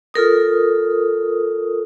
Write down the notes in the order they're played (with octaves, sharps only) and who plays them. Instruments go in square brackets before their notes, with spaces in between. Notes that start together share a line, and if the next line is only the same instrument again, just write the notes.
[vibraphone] F4 A4 A#4 D#6